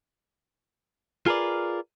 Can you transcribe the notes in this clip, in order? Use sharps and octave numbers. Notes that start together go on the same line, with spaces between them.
F4 G#4 A#4 B4 D5